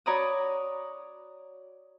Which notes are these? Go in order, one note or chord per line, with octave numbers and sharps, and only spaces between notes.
F#4 C#5 D5 A#5 B5 D#6